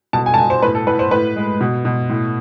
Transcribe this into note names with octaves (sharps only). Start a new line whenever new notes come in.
B2 A5
G#5
A5
B2 G#5
C5
A2 B4
A4
A2 B4
C5
A2 B4
G#3
B2
B2
A2